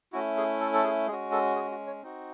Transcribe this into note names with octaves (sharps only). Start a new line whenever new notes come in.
A3 C#4 E4 F#4
G#4
A4
A4
G#4
G#3 C#4 F#4 G#4
A4
G#4
F#4
C#5
C4 D#4 F#4